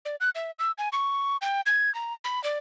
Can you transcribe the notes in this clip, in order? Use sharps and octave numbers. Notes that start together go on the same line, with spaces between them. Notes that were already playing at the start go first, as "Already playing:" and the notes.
D5
F#6
E5
E6
G#5
C#6
G5
G#6
A#5
B5
D5